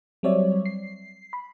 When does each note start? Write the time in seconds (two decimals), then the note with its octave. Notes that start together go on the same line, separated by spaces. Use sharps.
0.23 F#3 G3 C4 C#5 D5 E5
0.66 C7
1.33 B5